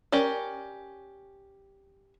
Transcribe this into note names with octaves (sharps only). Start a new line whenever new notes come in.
C#4 G4 A#4 D5